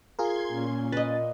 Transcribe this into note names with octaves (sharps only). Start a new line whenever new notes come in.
F4 G#4 A#4 C6 G#6
A#2 C#4
B4 D#5 A6